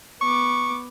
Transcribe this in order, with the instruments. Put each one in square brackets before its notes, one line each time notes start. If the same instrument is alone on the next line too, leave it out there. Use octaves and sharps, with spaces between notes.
[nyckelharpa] B3 D6 [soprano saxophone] C#6